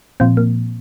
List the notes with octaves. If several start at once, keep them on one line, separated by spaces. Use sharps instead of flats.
A#2 F3 C4
A#3